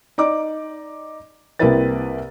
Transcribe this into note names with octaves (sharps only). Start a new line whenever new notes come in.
D#4 D5 D6
C2 A#3 C4 E4 B4 A6